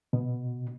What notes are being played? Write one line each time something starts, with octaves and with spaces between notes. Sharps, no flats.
B2